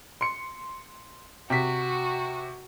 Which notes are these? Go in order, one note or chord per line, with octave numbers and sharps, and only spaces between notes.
C6 C#7
C3 F#4 B6